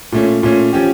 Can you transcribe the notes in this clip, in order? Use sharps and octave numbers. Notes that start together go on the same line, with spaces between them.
A#2 A3 C#4
A#2 A3 C#4
F3 C#4 G4